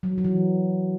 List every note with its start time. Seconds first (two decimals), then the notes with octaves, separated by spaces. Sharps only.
0.03 F#3
0.18 F#3
0.24 E3